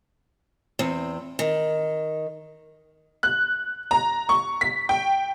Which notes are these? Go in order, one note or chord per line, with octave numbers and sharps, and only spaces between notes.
E2 C4
D#3
F#6
A#5
C#6
B6
G5